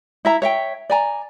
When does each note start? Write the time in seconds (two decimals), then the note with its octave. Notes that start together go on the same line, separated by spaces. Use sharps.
0.25 E4 E5 A#5
0.42 C#5 E5 G5
0.90 D5 G#5 A#5